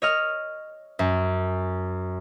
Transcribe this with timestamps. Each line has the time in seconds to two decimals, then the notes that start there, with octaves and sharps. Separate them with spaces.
0.02 C#5 D#5 F6
0.99 F#2